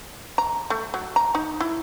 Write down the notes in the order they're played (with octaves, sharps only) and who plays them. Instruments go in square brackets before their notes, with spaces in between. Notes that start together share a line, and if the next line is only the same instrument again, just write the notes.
[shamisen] A#5
A3
F#3
A#5
D#4
E4